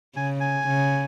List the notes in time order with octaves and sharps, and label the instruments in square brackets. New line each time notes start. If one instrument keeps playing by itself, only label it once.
[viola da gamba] C#3 [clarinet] G#5
[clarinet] G#5
[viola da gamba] C#3